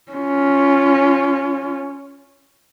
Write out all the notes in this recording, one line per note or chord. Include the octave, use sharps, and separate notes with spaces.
C#4 F4